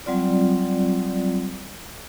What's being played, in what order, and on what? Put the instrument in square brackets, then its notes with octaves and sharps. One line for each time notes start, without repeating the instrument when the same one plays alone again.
[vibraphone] F#3 G3 C4 F4 D5